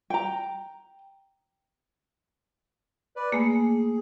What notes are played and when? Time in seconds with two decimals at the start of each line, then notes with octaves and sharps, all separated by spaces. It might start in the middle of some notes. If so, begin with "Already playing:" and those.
0.10 G5 A#5
3.16 B4 D5
3.32 A3 A#3 G#4